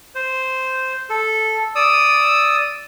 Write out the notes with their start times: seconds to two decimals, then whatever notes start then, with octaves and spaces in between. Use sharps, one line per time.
0.15 C5
1.10 A4
1.75 D5 D#6 E6